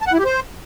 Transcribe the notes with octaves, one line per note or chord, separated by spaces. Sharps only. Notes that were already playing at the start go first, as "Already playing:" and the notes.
A5
F#5
E4
G4
C5